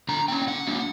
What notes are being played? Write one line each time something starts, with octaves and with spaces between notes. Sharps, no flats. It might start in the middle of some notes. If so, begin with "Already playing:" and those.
D3 A#5
A#3 C#4 G5
D3 F#5
F#3 A#3 D4